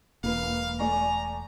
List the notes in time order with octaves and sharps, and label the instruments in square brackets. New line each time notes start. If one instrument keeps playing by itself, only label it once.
[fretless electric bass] E1 [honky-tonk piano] A#3 B4 [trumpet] F5
[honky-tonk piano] A3 D5 C#6 [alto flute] G#5 [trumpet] A#5